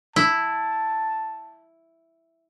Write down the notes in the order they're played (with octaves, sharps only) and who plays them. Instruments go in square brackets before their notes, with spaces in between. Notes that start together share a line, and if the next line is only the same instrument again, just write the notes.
[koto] E4 [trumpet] A5